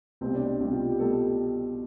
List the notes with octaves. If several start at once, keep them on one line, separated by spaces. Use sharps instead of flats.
C2 B2 G3 C4
D4
C2 B2 G3 G4
F4
G4
B2 G3 A4